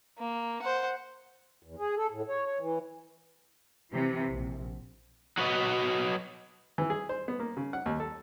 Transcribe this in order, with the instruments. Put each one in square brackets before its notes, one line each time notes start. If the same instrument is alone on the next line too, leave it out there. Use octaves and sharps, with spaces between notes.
[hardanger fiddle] A#3
C5 F#5
[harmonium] E2
G#4
A4
A2
C#5
C#5
E3
[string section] C3 E3
A#1
[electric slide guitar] F#3 F#4 B4 D#5
[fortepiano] E3
G#4
C5
B3
A#3
C#3
F#5
D#2
A4